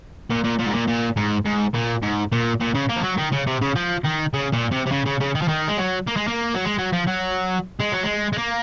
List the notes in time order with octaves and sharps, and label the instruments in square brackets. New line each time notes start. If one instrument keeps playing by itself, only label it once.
[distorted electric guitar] A#2
A#2
A#2
G#2
A#2
A#2
G#2
G#2
A#2
G#2
A#2
A#2
C#3
A#3
F3
F#3
D#3
C#3
C3
C#3
F3
D#3
C#3
A#2
C3
C3
C#3
C#3
C#3
D#3
F3
D#3
G#3
F#3
A#3
G#3
A#3
F#3
G#3
F#3
F3
F#3
G#3
F#3
G#3
G#3
A#3